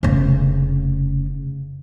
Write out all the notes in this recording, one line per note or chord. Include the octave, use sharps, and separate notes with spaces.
F1 C#3